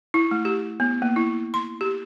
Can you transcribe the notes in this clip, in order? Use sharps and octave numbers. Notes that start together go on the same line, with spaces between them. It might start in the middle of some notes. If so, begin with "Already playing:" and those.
E4
A3
G4
B3
A#3
E4
C6
G4